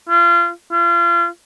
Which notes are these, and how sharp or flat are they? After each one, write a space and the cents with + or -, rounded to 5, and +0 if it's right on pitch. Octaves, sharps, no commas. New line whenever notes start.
F4 -30
F4 -35